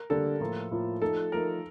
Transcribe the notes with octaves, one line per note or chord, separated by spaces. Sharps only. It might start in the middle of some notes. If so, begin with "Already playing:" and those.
Already playing: A#4
D3 G3 A#3 D4 G4 A4
A2 F3 A#3 F4
A2 F3 A#3 F4
F3 A3 D#4 A4
F3 A3 D#4 A#4